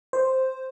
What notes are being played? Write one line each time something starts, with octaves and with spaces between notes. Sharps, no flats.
C5